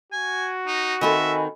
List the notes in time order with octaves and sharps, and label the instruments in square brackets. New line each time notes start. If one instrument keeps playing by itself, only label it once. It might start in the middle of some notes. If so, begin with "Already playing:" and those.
[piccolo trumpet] F#4 [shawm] G#5
[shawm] D#4
[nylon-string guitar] D#3 C4 A4 [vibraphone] D#5 G#5 B5 [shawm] E5